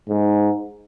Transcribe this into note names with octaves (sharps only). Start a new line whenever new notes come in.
G#2